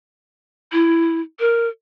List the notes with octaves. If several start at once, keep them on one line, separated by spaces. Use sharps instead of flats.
E4
A#4